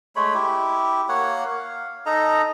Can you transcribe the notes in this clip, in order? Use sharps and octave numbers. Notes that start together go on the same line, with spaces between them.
G#3 A3 C#5 B5
E4 G4
A#3 C#5 F#5
F5
D#4 A4 D#5 A#5